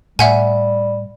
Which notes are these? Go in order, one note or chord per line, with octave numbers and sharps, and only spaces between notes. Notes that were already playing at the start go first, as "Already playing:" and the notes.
A2 G3 E5 F#5 G#5